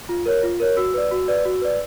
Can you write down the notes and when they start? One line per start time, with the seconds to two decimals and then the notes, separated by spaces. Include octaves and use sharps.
0.09 F4
0.26 A#4 C#5
0.43 F4
0.60 A#4 C#5
0.77 F#4 E6
0.94 B4 D5
1.11 F#4
1.28 B4 D5
1.45 F#4
1.62 B4 D5